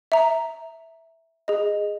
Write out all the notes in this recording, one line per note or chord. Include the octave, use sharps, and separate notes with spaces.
E5 A#5
G#4 D#5